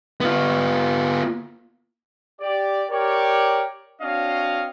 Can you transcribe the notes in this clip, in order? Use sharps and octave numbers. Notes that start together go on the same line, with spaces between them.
B3 F4
G4 D5
G4 A#4 C#5 D5
C4 D4 F#4 C#5 D#5 F5